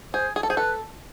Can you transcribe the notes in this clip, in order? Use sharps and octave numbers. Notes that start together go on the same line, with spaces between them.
G#4 C5
G#4
A4
G#4 C5
A4 B4